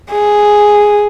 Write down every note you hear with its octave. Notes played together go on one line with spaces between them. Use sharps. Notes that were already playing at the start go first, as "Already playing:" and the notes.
G#4